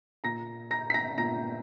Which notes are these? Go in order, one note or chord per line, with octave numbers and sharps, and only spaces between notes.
A#2 A#5 A#6
A#5 A#6
B6
A#5 A#6
A#2 A#5 A#6